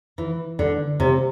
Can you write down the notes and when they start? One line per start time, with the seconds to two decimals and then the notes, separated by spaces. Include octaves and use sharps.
0.18 E3
0.59 D3
1.00 C3